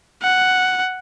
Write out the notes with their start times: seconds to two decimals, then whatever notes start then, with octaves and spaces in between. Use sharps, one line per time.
0.22 F#5